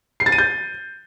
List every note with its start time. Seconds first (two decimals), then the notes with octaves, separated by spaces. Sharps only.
0.20 C7
0.26 A6
0.32 D#7
0.38 G6